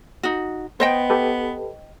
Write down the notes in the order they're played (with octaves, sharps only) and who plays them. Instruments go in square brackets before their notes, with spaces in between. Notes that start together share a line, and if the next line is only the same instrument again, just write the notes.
[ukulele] D#4 F#4
[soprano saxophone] B3 [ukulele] C5 D#5 G5
[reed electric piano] G4 A4 B4